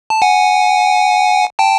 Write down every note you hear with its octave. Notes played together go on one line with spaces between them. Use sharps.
A5
F#5 G#5
G5 A5